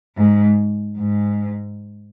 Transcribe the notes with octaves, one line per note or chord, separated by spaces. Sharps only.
G#2
G#2